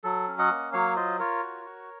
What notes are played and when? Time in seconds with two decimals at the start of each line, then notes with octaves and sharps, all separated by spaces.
0.04 F#3 A4
0.28 C#4
0.39 D#5 F#5
0.51 A#3
0.73 F#3 C#5 F5
0.96 F4 C5 D#5
1.19 F4 A#4 C#5
1.43 F#4
1.65 F#4